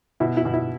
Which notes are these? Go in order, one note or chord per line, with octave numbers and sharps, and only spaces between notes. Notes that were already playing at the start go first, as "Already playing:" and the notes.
B2 E4
E4
B2
E4